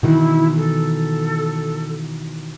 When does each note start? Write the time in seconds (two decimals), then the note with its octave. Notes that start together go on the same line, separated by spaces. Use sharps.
0.03 B2 D#3 E3 E4
0.57 A4